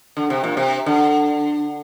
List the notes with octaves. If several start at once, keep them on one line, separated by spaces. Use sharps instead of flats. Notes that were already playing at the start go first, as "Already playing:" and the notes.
D3
C3
A#2
C3
D3